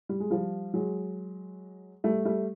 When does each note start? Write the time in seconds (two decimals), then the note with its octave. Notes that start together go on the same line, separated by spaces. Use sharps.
0.09 G3
0.20 G#3
0.30 F3 G3
0.74 F#3 G#3
2.04 G3 A3
2.25 G3 A3